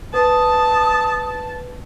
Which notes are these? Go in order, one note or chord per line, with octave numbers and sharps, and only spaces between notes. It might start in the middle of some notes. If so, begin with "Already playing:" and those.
B4 A5 D#6